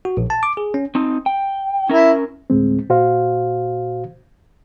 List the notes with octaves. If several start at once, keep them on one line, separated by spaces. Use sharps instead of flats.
F#4
A#1
A5
D6
G#4
C#4
C4 D#4
G5
C#4 E4 A#4
D2 A2 G#3 C4
A#2 F#4 C5 F5